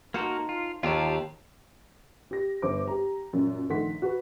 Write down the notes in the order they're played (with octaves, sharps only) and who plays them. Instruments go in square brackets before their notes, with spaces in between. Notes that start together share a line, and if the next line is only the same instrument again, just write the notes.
[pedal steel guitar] A#3 F#4 A#4 [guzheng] D#4 A4 C5
[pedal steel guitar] F4
[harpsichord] D#2 [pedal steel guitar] F4 G4 A5 [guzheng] A#4 C#5 F5
[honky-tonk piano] G4 A#6
G1 C5 D6
G4 A#5
F#2 A#2
A#1 D#3 A3 F#5 C6 B6
F#4 B4